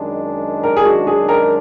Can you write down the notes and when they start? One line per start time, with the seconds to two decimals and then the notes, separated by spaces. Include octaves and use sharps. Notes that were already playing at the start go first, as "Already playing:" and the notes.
Already playing: F#2 D#3 G#3 D4
0.63 A#4
0.77 G#4
0.85 F#4
1.07 G#4
1.29 A#4